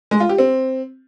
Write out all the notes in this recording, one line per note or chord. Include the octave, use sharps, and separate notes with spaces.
G#3
F4
G4
C4